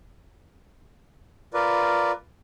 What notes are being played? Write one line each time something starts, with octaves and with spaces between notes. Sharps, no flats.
F4 A#4 B4 D5